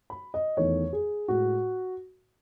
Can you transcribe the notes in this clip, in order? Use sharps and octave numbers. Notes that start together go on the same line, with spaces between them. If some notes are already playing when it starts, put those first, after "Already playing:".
B5
D#5
E2 D#3 A3 C#5
G#4
A2 G#3 F#4